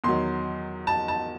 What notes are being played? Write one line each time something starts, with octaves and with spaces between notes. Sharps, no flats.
E2 D#3 F#3 C6
A5
A5